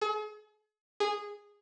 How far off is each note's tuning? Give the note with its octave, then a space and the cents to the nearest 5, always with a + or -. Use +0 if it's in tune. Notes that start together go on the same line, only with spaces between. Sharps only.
G#4 +45
G#4 -15